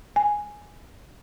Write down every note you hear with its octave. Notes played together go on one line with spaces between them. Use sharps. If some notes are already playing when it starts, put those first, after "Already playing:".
G#5